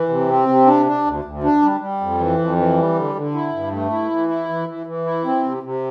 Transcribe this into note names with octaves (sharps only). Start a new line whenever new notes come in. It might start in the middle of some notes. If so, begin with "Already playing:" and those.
Already playing: E3
C3
C4
C3
D4
D4
D2
D2
D4
G3
G3
F2
E3
F2
E3
G3
D3
D3
E4
G2
A3
E4
E3
E4
E3
E3
E3
E4
C4
C3
C3